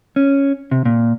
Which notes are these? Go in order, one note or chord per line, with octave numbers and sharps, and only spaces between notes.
C#4
C3
A#2